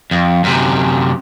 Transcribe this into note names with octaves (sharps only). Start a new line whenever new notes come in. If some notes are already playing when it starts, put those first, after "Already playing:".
F2
F#2 C3